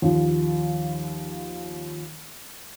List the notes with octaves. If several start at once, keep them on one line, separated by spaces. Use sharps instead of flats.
D#2 F3